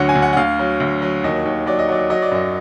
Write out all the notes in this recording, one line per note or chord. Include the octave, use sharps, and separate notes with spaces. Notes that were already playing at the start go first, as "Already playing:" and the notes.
Already playing: D2 D3 F#3 F#5
G#5
D2
F#5
F#5
D2 F5
F#3
D2
F#3
D#2 D#5
D#2
F#3 D5
D#5
F#3 D5
F#3 D#5
D5
F#2 D#5